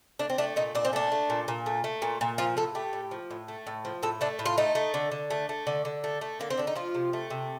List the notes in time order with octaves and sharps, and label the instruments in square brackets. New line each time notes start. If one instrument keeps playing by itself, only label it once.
[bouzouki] A3 D4
C4
A3 D4
A#2 D#4
A#2 D4
C4
A3 D4
A3
A#2
A#2
A3
A3
A#2
A#2
F3 F4
A2 A4
A3 G4
A2
F3
A2
A3
A2
F3
A2 A4
A3 D4
A2
F4
A3 D#4
A3
D3
D3
A3
A3
D3
D3
A3
A3
D3 A#3
C4
D3 D4
D#4
F3 F4
C3
A3
C3